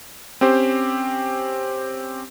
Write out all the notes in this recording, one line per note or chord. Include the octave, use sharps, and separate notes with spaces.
C4 C#4 G4 C5